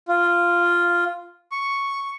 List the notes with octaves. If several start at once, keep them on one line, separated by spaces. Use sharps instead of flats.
F4
C#6